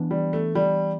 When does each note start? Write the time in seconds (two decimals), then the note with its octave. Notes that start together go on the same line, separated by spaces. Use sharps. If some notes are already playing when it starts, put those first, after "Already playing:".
Already playing: E3 B3 D4
0.11 G3
0.33 A3
0.55 G3